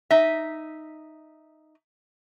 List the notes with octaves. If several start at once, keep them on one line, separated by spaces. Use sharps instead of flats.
D#4 E5